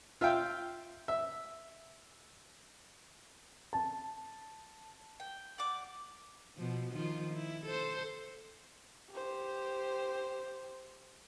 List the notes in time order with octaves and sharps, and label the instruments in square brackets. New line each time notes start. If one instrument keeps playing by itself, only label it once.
[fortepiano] F4 E5 F5 G5
E5
[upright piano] A5
[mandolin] G5
D5 F#5 D6
[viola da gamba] B2 F3
D#3 F3 F4
E4
A4 C5
[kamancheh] G4 C5